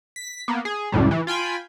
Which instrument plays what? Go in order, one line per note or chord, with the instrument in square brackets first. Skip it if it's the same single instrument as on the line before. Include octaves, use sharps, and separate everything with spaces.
[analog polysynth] B6
A#3 B3
G#4
C#2 F#2 A2 G3
E3
F4 G5 G#5 B5